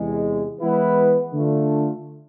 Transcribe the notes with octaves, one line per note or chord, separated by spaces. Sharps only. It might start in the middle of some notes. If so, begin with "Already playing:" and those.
Already playing: E2 C3 G#3
E3 G#3 B3 E4 B4
D3 A3 D4 F4